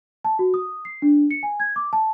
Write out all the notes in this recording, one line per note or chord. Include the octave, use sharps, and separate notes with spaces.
A5
F#4
D#6
C7
D4
C#7
G#5
G#6
D6
A5